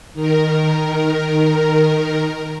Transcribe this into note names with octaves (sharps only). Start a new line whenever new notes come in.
D#3 A#4